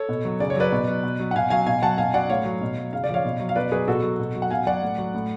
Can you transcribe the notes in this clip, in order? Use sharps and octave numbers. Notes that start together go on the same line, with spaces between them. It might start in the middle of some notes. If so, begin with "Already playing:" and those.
Already playing: A4 C#5
B2
F#3
C#3 D5
C#5
F#3 B4 D5
B2
F#3
B2
F#3
F#5
B2 F5 G#5
F#3 F5 G#5
B2 F5 G#5
F#3 F#5 A5
B2 F5 G#5
F#3 D5 F#5
A2 C#5 F5
F#3
B2
F#3
C#3 F5
D5
F3
C#5 F5
B2
F#3
F5
B2 B4 D5
F#3 G#4 B4
B2 F#4 A4
F#3
B2
F#3
F#5
B2 F5 G#5
F#3 D5 F#5
A2
F#3
A2